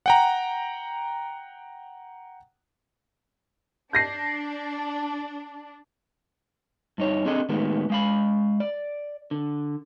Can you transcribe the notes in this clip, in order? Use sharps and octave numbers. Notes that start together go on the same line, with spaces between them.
F#5 G5 A#5
D4 G6 A#6 C7
G2 D#4 C#5
C4 D4 G#4 A4 D#5
A2 D#3 G#3 A#3 B3
G#3 F5 B5
D5
D3